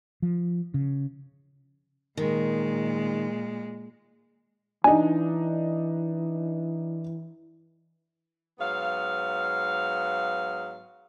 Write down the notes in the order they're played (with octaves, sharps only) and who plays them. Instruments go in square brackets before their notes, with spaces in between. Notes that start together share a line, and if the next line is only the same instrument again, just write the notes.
[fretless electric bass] F3
C#3
[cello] A#2 G#3 [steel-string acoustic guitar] D#3
[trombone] E3 [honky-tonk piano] D4 D#4 [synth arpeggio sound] G#5
[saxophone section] G#2 F#3 B3 F5